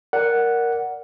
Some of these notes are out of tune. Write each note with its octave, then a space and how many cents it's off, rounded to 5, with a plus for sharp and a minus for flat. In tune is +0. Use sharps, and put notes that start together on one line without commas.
A#4 +0 D5 -15 F#5 +0